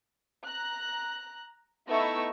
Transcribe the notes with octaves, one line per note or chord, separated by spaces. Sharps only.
A#5 F#6
A3 B3 D#4 E4 C#6 E6